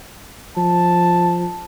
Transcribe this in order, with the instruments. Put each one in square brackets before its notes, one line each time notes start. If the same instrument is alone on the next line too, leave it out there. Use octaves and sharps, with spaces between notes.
[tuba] F3 [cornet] A5